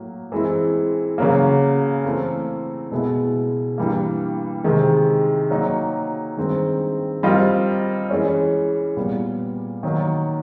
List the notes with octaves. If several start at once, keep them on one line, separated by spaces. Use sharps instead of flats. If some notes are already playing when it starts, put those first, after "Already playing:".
Already playing: A2 F#3 A#3
E3 G#3 C4 E4
C#3 F#3 A#3
E3 A3 C4
B2 G#3 B3 E4 G#4
G2 E3 G3 A#3
C3 D#3 G#3
F#3 A#3 D#4
G2 D#3 G#3 C4
G3 C4 F4 A#4 D#5
E3 G#3 C#4
A#2 G3 B3
D#3 F#3 A#3